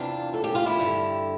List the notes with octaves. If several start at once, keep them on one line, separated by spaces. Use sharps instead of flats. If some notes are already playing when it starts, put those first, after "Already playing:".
Already playing: E2 C3 E3 D4 F4
A4
G4
F4
E4 G4
G2 D3